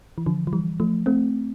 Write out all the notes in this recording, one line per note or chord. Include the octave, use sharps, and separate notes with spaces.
E3
D3 F3
F3
E3 G3
F3 A3
A3 C4